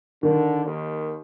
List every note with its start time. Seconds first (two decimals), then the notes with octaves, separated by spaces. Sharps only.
0.23 D3 D#3
0.66 D#2